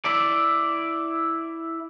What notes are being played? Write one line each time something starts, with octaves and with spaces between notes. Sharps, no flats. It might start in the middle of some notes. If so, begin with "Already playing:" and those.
E4 D5